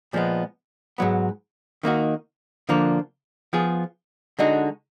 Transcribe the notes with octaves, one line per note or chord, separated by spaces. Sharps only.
A#2 F3 G#3 B3
G#2 F#3 B3
D#3 A#3 D#4 F#4
D3 F3 A#3 D4
F3 B3 F4 G#4
D3 G#3 D#4 F#4